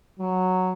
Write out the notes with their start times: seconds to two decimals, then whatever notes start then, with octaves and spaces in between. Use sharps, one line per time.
0.19 F#3